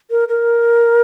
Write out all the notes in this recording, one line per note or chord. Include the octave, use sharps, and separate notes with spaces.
A#4
A#4